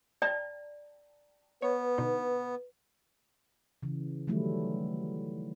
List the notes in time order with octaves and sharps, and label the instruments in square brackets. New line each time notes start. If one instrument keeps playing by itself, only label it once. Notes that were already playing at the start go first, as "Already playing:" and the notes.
[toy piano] D5 [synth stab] G5 A5 A#5
[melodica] B3 [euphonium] B4 [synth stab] C#5
[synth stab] B2 D3 D#4
[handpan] C#3 E3
D#3 E3 F#3 G3 A3 E4